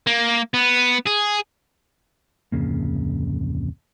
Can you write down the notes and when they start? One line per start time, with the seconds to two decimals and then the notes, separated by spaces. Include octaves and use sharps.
0.07 A#3
0.54 B3
1.07 G#4
2.52 D1 F2 C#3 A#3